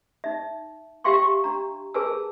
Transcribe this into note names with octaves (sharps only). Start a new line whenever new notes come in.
D#4 E5
G4 E5 F5 G5 C6 C#6
D4 A#5
G#4 A#4 B4 G#5 A5 E6